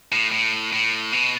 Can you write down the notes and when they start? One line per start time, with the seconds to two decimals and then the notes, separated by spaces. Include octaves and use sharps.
0.12 A2
0.31 A2
0.72 A2
1.12 B2